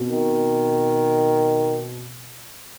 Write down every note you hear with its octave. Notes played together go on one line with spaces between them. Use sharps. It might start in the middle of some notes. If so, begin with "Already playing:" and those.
Already playing: B2 C4
D#3